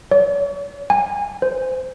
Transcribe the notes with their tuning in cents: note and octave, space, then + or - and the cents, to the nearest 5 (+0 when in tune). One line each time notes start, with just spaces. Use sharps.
C#5 +40
G#5 -25
C5 -25